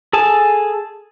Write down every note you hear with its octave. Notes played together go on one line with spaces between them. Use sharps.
G#4 A4 G#5 A5